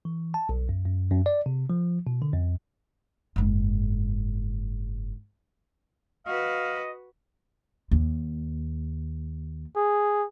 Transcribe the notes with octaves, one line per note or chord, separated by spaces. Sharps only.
E3
A5
B1
F#2
F#2
F#2
D5
C3
F3
B2
D3
F2
F#1 G#2
F#4 B4 D#5 F5
D#2
G#4